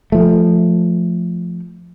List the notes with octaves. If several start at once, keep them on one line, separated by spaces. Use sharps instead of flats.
F3 A3